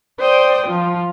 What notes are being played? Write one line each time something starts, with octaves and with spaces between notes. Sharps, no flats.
C5 D5 G5 D#6
F3 F4